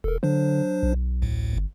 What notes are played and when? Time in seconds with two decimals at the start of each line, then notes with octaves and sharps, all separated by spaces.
0.04 E1 A4 A#4
0.23 D3 F#3 D4 C5
0.83 B1
1.22 A1 D2 A2
1.53 G1